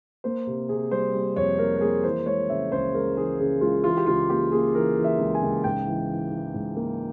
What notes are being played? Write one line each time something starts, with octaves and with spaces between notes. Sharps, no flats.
A#3 C5
C3
C3 G#4
G3 C5
G3
F2 C#5
A#3 A#4
A#4
A#3 G#4
E3 C5
G#3 C#5
C#3 E5
C#2 C5
G#3 A#4
E3 G#4
C#3 G#4
G#3 F4
E3 F4
G4
C#2 F4
A#3 G4
A#3 G#4
E3 A#4
E3
E5
C#2
G#5
C#2
G#2 G5
E3
E3
E3
G#2
A#3